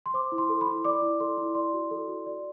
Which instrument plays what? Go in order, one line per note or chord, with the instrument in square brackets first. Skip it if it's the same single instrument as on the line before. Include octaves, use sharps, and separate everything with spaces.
[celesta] C6
C5 D6
E4
C6
A4
B5
E4
D5 D6
E4
A4 C6
E4
D5 C6
F#4
A4
F#4
D5